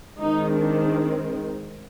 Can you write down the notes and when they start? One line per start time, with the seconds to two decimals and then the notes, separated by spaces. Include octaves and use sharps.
0.21 D#3 G#3 C4 D#4
0.57 D4